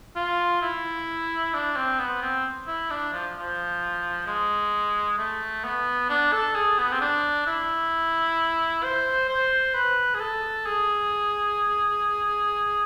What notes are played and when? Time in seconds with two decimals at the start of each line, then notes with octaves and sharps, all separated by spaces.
0.16 F4
0.62 E4
1.54 D4
1.76 C4
1.99 B3
2.22 C4
2.67 E4
2.90 D4
3.13 F3
3.39 F3
4.27 G#3
5.18 A3
5.64 B3
6.09 D4
6.32 A4
6.55 G#4
6.78 B3
6.92 C4
7.01 D4
7.46 E4
8.83 C5
9.29 C5
9.74 B4
10.14 G#4
10.20 A4
10.66 G#4